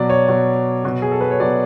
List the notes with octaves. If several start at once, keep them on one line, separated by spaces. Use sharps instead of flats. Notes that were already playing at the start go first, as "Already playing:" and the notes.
Already playing: B2 F#3 D5
C#5
B2 F#3
B2 F#3
G#4
A4
B4
C#5
B2 F#3 D5